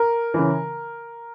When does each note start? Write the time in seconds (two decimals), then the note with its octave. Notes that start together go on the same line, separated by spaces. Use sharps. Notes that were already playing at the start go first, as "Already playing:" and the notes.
Already playing: A#4
0.34 C#3 E3